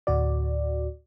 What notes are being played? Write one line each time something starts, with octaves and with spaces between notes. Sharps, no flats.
D2 A2 F#4 D5